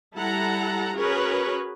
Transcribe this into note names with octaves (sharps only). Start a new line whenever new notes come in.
G3 E4 A4 F#5 A#5
C#4 F#4 G#4 A#4 B4 C#5